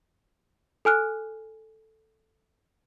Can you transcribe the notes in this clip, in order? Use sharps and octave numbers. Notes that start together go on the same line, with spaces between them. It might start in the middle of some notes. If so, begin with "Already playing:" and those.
A4 G#5 F6 F#6